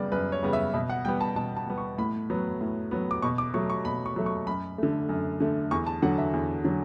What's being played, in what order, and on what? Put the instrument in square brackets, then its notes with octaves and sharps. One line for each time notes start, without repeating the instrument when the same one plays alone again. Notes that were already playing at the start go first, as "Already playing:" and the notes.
Already playing: [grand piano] F#2 C#3 G3 B3 D5
F#2 B4
C#5
C#3 G3 B3
E5
B2 E5
F#5
G3 B3 G5
A5
B2 A5
A5
G3 B3
C#6
A2 B5
F#3 B3
A2
F#3 B3
D6
B2 C#6
D6
F#3 A3 C#6
C#6
B2 B5
C#6
F#3 A3
C#6
F#2 B5
D3 A3
F#2
D3 A3
E2 C#6
A5
D3 F#3 F#5
E5
E2
D3 F#3